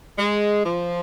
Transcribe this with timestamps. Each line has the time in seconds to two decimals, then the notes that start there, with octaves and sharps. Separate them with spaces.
0.19 G#3
0.66 F3